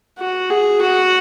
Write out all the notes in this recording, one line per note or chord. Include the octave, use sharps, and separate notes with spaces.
F#4
G#4
F#4